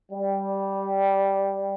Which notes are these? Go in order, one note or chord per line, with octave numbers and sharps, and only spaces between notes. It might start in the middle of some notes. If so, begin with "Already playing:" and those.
G3